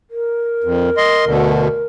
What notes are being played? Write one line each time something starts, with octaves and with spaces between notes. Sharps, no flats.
A#4
F2
D#5 C6
D2 B2 D3